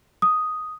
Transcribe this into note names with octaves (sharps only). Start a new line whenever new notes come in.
D#6